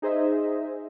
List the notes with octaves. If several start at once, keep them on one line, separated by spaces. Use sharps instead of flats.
D#4 G#4 C5 D#5 E5